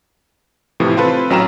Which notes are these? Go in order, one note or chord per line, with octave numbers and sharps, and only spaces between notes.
A2 C3 E3 F3
C4 F4 A4 B4
A1 F#3 C#4 G5 A#5 E7